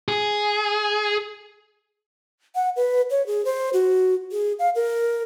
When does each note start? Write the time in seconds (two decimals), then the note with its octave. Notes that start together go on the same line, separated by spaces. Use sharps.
0.08 G#4
2.55 F#5
2.76 B4
3.10 C#5
3.27 G#4
3.45 C5
3.73 F#4
4.32 G#4
4.59 F5
4.75 A#4